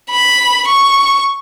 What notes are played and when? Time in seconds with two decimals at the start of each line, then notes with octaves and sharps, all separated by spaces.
0.11 B5
0.67 C#6